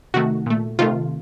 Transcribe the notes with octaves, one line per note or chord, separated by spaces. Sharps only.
C3 D#3 A3 F#4
A#2 A3
C3 D#3 A3 F4